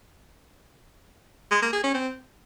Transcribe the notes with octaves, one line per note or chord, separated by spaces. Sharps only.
G#3
A#3
G#4
C#4
C4